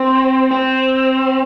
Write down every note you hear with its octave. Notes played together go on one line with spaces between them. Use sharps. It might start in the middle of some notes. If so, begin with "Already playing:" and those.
Already playing: C4
C4